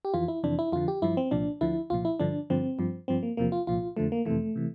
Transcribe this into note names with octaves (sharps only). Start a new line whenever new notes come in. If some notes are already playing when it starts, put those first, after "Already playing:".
G4
F2 E3 F4
E4
F2 C3 E3 D4
E4
F2 D3 F3 F4
G4
G2 F3 E4
C4
C2 A#2 F3 D4
D2 D3 F3 E4
C2 A#2 F3 F4
E4
G2 D3 F3 D4
G2 D3 F3 C4
G2 F3
G2 F3 C4
A#3
E2 C3 F3 A#3
F4
C2 A#2 F3 F4
F2 D3 F3 A3
A#3
F2 C3 E3 A3
C3 E3